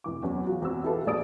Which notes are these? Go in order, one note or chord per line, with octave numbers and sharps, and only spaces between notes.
F1 E3 D6
E2 F#3 C#4
F4 F#4
E2 C4 F#4 E6
E4 F#4 G4 A4 B4 F5
A#1 G#4 D5 D#6 E6 D7